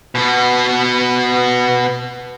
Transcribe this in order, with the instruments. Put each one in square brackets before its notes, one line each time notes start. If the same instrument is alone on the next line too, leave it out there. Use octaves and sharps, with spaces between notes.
[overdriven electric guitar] B2 B3